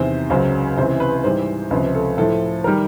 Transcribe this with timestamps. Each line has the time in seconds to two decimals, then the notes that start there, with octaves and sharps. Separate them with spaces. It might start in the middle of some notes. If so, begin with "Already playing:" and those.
Already playing: E2 C3 D#3 C5
0.30 C#2 C#3 F#3 C5
0.77 C#2 C3 E3 C5
1.00 B4
1.24 G#2 E3 G3 C5
1.71 C#2 C3 F3 B4
1.95 A4
2.18 A2 F3 A4
2.64 D#3 G3 A#4